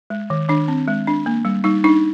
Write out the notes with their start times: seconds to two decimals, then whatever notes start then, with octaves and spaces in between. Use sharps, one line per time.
0.10 G#3
0.30 D#3
0.49 D#3 D4
0.68 C4
0.88 G#3
1.07 D4
1.26 A#3
1.45 G3
1.64 G3 D#4
1.84 D4 D#4